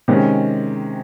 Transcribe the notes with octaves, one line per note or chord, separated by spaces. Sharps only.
C3 D#3 G#3 C#4